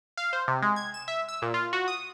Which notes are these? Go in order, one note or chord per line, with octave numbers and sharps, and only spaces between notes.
F5
C5
C3
G#3
G#6
E7
E5
E6
A#2
F4
F#4
D#6